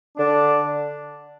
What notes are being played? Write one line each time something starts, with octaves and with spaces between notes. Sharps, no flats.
D3 D4